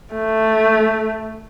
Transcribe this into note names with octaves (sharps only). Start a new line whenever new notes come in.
A3